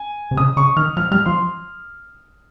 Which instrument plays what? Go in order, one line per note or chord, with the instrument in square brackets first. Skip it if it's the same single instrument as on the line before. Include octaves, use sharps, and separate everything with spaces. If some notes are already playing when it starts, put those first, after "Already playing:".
Already playing: [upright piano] G#5
[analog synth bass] C3
[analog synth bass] C#3 [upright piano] D#6
[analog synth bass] C#3 [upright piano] C#6
[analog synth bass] D#3 [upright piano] F6
[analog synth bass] F3 [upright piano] F6
[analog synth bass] G3 [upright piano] F6
[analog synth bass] F3 [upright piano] C6